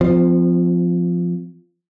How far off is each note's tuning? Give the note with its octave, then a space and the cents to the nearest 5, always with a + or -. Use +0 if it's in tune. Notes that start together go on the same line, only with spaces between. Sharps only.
F3 +0 C4 -25